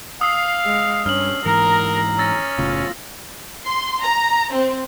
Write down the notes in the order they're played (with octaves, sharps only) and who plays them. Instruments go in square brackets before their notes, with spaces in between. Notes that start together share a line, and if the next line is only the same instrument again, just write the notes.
[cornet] F5 [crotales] D#6 E6 C7
[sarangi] G#3
[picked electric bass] G2 [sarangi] C#4 [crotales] F6 F#7
[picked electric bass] G#2 E3 [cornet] A#4 [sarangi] A#5
[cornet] C#4 [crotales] E6 A6 A#6
[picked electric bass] F#1 A2 C#3 [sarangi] F4
[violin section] C6
A#5
C4